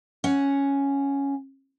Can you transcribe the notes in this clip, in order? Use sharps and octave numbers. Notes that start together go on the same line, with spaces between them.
C#4 F#5